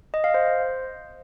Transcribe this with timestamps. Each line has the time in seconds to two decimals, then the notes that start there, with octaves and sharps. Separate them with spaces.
0.14 D#5
0.24 F5
0.34 C5